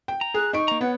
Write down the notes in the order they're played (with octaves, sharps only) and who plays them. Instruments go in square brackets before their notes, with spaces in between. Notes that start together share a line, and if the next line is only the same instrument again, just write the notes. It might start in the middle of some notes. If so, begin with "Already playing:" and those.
[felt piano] G5
[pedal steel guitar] A#5
[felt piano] G#4 [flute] F#6
[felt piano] D#4 D7 [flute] C#6
[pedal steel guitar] A#3 A#5
[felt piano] B3 [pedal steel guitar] C#5 [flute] F#5